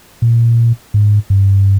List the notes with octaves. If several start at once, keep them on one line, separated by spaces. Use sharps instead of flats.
A#2
G#2
G2